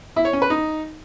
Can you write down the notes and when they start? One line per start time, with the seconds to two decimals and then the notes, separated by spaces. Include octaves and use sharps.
0.16 E4
0.25 C#5
0.33 C#4
0.42 B4
0.50 D#4